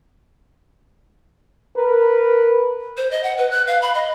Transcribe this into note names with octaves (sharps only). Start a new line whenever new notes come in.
A#4 B4
C5
D#5
F#5
B4
F#6
F5
B5
D#5